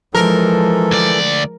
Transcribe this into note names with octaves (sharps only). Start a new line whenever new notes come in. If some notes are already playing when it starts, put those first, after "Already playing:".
E3 F3 G#3 A4 A#4
D2 D5